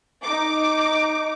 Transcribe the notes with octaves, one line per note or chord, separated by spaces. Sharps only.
D#4 D6